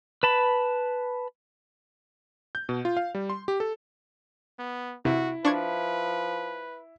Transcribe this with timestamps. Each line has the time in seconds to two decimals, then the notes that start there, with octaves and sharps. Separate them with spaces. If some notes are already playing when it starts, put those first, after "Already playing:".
0.23 B4 A5 B5
2.55 G6
2.69 B2
2.85 F4
2.97 F5
3.15 G3
3.30 C6
3.48 G4
3.60 A4
4.59 B3
5.05 C3 E4 F#4
5.45 F3 D4 B4 C#6 G#6